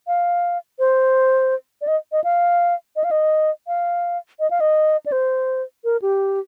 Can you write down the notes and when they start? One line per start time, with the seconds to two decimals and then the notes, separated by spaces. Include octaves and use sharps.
0.07 F5
0.79 C5
1.81 D5
1.87 D#5
2.12 D#5
2.24 F5
2.96 D#5
3.04 F5
3.11 D#5
3.67 F5
4.40 D#5
4.51 F5
4.60 D#5
5.06 D5
5.12 C5
5.84 A#4
6.02 G4